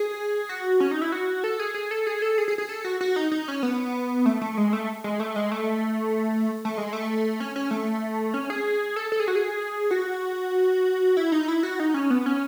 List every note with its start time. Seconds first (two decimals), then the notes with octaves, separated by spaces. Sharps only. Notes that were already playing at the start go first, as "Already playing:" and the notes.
Already playing: G#4
0.49 F#4
0.80 C#4
0.91 D#4
1.02 E4
1.12 F#4
1.44 A4
1.59 G#4
1.74 G#4
1.91 A4
2.07 G#4
2.22 A4
2.38 G#4
2.48 G#4
2.58 G#4
2.69 A4
2.85 F#4
3.01 F#4
3.16 D#4
3.32 D#4
3.48 C#4
3.63 B3
4.26 A3
4.41 A3
4.57 G#3
4.73 A3
5.04 G#3
5.20 A3
5.36 G#3
5.52 A3
6.65 A3
6.77 G#3
6.93 A3
7.40 C#4
7.56 C#4
7.71 A3
8.34 C#4
8.50 G#4
8.96 A4
9.12 A4
9.20 G#4
9.28 F#4
9.35 G#4
9.91 F#4
11.17 E4
11.32 D#4
11.48 E4
11.63 F#4
11.80 D#4
11.94 C#4
12.10 B3
12.26 C#4